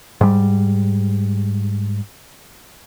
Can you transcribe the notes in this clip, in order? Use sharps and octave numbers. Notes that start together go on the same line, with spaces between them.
G#2 G3